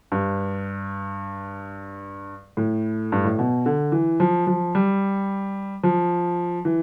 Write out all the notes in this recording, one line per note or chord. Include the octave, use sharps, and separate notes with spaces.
G2
A2
G2
A2
B2
D3
E3
F3
F3
G3
F3
E3